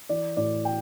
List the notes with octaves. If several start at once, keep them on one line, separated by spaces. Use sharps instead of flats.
E3 D5
A2 D5
G5